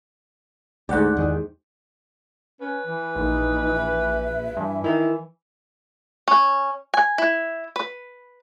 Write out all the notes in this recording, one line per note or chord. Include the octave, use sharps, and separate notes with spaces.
D2 G#2 G4 D5 F#5
E2 D#3
C#4 B4
E3
A#1 D#4
E5
G2 E3
D#3 E4
C#4
G#5
E4
B4